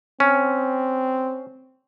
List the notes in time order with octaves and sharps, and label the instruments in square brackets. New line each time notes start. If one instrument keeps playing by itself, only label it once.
[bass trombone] C4 [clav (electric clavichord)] C#4